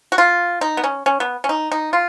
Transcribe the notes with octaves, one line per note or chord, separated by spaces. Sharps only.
F#4
F4
D#4
B3
C#4
C#4
B3
C#4
D#4
D#4
F4